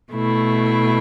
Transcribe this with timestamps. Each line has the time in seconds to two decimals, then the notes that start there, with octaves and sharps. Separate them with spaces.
0.12 B2 A3 E4